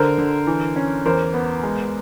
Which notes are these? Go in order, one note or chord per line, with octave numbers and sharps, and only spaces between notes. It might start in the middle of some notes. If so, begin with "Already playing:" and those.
Already playing: D3 A#4 C5
D3
E3
C#4
E2 A#4 C5
B3
G#3